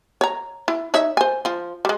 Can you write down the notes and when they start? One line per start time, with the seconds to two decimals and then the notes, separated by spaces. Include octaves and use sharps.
0.21 C#5 A#5
0.68 E4
0.94 D#4 C#5 E5
1.17 C5 G#5
1.45 F3 F4
1.85 G3 G#3